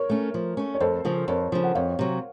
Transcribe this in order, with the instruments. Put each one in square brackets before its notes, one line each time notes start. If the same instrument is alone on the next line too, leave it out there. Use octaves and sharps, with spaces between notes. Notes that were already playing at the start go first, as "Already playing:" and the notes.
Already playing: [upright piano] A#4 C#5
[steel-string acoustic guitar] A3 C#4
F3
A3 C#4
[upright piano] C#5
[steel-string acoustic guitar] F2 [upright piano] A4 C5
[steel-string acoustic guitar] C#3 F3
[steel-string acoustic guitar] F2 [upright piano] A#4 C#5
[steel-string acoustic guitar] C#3 F3
[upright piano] F#5
[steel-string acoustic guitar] F2 [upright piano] C#5 F5
[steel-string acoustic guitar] C3 F#3